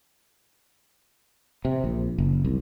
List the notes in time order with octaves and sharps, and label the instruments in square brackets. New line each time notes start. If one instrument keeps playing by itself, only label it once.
[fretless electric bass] C3
A#1
F#1
C2